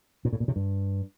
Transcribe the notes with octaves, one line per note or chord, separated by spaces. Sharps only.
A#2
A2
A#2
C3
G2